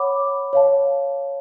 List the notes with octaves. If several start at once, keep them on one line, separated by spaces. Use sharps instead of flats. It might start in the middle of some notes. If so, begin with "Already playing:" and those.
Already playing: C#5 F#5 B5 D6
C#5 F5 A5